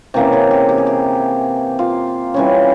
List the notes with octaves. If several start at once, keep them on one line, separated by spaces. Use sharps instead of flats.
C3 E3 A#3 C#4 G4
G#4
G4
G4
G#4
G4
F4
E3 G3 C#4